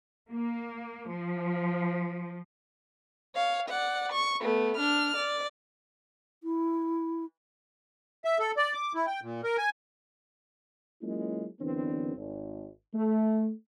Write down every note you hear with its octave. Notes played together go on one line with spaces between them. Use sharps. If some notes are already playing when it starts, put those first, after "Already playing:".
A#3
F3
C#5 F5
D5 F#5
C#6
A3 B3
D4 F6
D5
E4
E5
A4
D5
D6
E4
G5
A#2
A#4
G#5
F#3 G#3 A#3 C#4 E4 F4
F#2 D3 E3 B3 C4 D4
G#1
A3